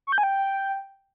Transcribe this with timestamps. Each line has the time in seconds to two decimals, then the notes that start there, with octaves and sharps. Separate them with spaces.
0.07 C#6
0.12 G6
0.18 G#5
0.23 G5